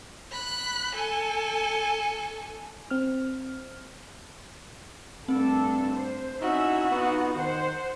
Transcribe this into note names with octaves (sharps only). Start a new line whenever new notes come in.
B5 F#6
A4 G#5
C4 F6
G2 A3 C4 D4 A4
C5
C#4 D#4 E4 F#4 E5
B3 D#4 F4
D#3 C5 F#5